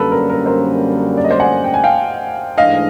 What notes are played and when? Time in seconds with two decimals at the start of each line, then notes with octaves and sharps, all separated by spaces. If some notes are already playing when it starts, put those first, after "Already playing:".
Already playing: F#2 D3 G3 A#3 C#4 A4 B4
0.12 A#4
0.30 A#4
0.46 A#4 C5
1.17 D5
1.24 D#5
1.31 C5 D5
1.40 F#5 G#5
1.64 G5
1.74 G#5
1.84 F5 G5
2.57 G#2 E3 A3 D4 D#5 F5